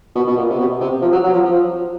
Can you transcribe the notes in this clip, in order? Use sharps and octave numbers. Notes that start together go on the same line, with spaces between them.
B2
B2
A#2
C3
B2
C3
F3
F#3
F#3
F3
F3